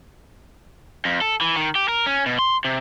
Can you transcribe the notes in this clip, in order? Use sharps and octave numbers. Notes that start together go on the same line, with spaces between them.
F2
A4
E3
D#3
G4
A#4
C#4
B2
C6
C3